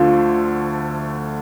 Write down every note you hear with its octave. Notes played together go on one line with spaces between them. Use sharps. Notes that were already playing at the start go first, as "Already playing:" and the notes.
Already playing: D2 D3 F3 A3